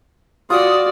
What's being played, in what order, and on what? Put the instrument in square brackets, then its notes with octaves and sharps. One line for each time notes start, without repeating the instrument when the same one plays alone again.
[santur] F4 [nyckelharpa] F#4 D5 [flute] D#6